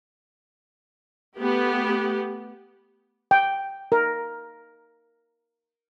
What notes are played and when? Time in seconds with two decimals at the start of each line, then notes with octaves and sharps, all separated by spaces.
1.39 A3 B3 G4
3.31 G5
3.92 A#4